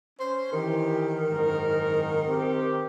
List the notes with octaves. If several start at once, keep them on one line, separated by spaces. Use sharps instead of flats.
C#4 C5
D#3 E3 G4
F#1 G#2 A#4
C4 G4